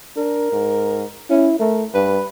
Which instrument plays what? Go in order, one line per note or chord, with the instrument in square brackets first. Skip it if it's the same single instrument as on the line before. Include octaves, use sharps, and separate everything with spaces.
[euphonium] D4 [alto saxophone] A#4
[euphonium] G#2
[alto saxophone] C#4 [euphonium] E4
[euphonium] A3 [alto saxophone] A#4
[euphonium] G2 [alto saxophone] B4